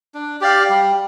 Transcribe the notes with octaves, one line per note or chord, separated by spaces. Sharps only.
D4
G4 D5 F5
G3